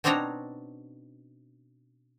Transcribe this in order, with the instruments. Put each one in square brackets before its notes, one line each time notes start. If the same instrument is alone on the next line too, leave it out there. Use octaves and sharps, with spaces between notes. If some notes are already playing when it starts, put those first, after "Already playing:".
[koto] B2 C4 D4 D#4 C#5 A#5